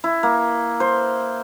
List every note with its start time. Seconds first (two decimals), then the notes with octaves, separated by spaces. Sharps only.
0.04 E4
0.23 A#3
0.80 C5